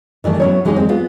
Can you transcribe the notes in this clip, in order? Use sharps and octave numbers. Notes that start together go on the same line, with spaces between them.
D#3 E3 G3 A3 A4
F#3 B3 C#4 E4 C#5
E3 G#3 D#4 G4 G#4
G#3 C4
G#3 B3 F4